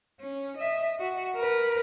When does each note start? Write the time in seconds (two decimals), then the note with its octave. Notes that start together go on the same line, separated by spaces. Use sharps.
0.20 C#4
0.57 D#5 E5
1.00 F#4
1.36 A#4 B4